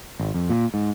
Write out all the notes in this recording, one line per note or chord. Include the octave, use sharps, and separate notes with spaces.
G#1
F2
A#2
G#2